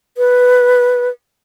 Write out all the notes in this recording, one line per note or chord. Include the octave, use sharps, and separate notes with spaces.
B4